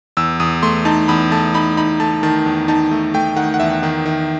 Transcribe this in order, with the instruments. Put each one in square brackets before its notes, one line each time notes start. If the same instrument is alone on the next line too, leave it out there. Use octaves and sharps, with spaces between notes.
[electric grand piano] E2 E6
E2 D#6
A3 C6
D#4 A5
E2 B5
A3 A5
D#4 B5
D#4 B5
A3 A5
D#3 A5
E2
D#4 A5
A3
A3 G5
D#3 F#5
F#5
E2 E5
D#3
D#3